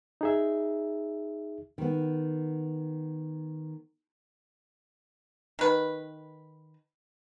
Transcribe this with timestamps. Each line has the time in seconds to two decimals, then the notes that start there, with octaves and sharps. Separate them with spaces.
0.21 D#4 G#4 E5
1.78 D#3 B3
5.59 D#3 B4